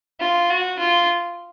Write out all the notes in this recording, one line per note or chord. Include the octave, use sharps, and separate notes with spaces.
F4
F#4
F4